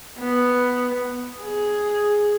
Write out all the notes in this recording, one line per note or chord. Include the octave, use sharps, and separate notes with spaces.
B3
G#4